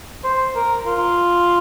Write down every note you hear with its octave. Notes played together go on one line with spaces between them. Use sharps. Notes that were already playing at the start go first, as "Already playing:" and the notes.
C5
A#4
F4